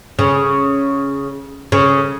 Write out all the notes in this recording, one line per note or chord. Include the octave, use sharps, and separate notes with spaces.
C#3
C#3